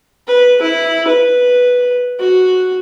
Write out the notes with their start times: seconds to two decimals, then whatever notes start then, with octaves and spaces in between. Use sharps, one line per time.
0.27 B4
0.62 E4
1.08 B4
2.19 F#4